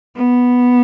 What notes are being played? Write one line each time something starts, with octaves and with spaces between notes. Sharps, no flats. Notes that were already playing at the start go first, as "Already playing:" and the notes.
B3